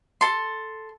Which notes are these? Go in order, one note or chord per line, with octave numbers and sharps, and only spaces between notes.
A4 C6